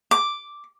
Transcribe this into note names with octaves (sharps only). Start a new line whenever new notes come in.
D6